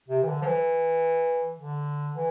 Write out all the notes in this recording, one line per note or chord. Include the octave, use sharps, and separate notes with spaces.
C3
E3
D3
F3
E3
D3
E3